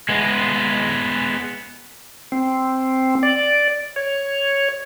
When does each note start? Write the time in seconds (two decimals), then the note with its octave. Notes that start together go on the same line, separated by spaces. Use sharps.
0.09 G#3 B3
2.32 C4
3.23 D5
3.96 C#5